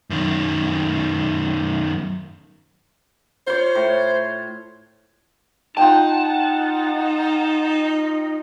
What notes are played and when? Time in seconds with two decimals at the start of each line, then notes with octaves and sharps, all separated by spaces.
0.10 F#2 D#3
3.47 F4 C5 C#5
3.75 A2
5.77 D#4 F4 F#5 G5 A5